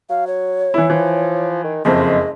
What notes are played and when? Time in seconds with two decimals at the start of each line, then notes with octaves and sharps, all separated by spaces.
0.10 F#3 F5
0.27 C#5
0.74 E3 E4
0.90 E3 F3
1.64 D#3
1.85 F#1 F2 G#3 C5 D#5